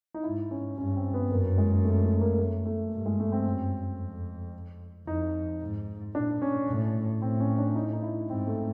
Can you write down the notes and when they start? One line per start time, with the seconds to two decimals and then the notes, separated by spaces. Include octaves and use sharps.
0.14 D#4
0.23 G#2 E4
0.51 C#4
0.77 G2 C#4
0.96 C4
1.14 B3
1.31 F#2 A#3
1.58 G#3
1.85 A3
2.03 A3
2.21 A#3
2.39 A3
2.66 A3
2.93 G2
3.06 G#3
3.20 A3
3.32 C4
3.46 F#2
4.00 F2
5.07 F2 D#4
5.61 G#2
6.15 A#2 D4
6.42 C#4
6.68 A2
7.22 A2 C4
7.40 C#4
7.58 D4
7.75 D#4
7.93 D#4
8.02 E4
8.30 G#2 C4
8.47 A3